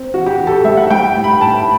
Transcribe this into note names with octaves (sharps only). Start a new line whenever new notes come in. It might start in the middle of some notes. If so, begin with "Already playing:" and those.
Already playing: C4
E3 F#4
G4
E3
A4
G4
G3 E5
F#5
G3 G5
A2
B5
A2 A5